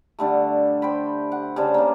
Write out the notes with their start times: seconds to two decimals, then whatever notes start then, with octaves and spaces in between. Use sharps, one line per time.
0.19 D3 G3 A3
0.82 C5 G5 B5
1.32 F#5
1.56 C#3 G3 D4 C5
1.74 C#3 A#3